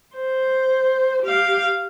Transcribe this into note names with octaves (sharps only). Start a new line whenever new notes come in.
C5
G4 F5